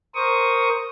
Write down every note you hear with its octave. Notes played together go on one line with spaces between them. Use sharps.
A#4 C5 C#6 D#6